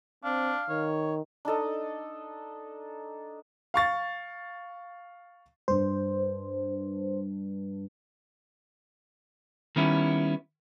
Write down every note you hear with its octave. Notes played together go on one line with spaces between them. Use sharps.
C4 D4 F5
D#3 C#5
D4 D#4 A4 D#5
F5 C#6 A6
G2 D4 C5
D#3 G3 B3 C#4 E4